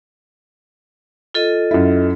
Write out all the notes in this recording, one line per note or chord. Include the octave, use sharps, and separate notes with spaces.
F4 A4 D#5
F#2 E4